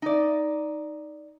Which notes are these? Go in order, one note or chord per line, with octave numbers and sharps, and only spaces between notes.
D#4 D5